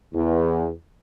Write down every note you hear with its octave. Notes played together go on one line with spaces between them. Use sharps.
E2